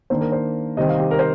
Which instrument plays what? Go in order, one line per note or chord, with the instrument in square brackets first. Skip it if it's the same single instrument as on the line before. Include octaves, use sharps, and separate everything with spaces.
[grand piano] D#3 A#3 D4 C5
A#4
C5
C3 D#3 G3 C4 D#5
F5
G4
A#4
C5